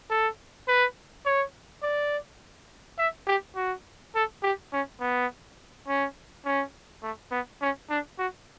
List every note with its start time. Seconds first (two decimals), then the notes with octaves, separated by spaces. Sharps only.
0.10 A4
0.68 B4
1.26 C#5
1.83 D5
2.99 E5
3.27 G4
3.56 F#4
4.15 A4
4.43 G4
4.73 C#4
5.00 B3
5.88 C#4
6.45 C#4
7.03 A3
7.31 B3
7.61 C#4
7.90 D4
8.18 F#4